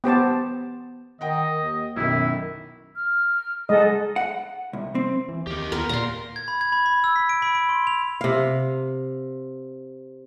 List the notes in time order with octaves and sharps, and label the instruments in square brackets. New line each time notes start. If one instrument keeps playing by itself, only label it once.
[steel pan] B3 G4 C5 A5
[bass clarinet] D#3 [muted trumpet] D#5 [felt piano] F#5 G5
[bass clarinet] D#2
[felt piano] B1 D#3 [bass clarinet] F#2 [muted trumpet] E4
[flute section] F6
[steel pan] G#3 D#5 [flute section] G#4 A4 F#5
[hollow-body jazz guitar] F#5
C2
C4
[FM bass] E3
[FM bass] D#2 [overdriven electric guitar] G4 A#4
[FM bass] D#2 [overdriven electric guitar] B3 C6 [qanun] A#4
[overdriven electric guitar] A#2 [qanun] A#5 C6
[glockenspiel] G#6
B5
G#6
B5
B5
E6
B6
D7
B5
D7
C6
F7
[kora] C3 F5